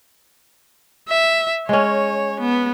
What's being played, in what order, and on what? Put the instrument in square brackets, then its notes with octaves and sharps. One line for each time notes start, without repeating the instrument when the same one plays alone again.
[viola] E5
[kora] G#3 C#4 [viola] C#5
[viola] B3